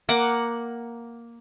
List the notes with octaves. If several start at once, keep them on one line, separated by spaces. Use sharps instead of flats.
A#3 F#5 D6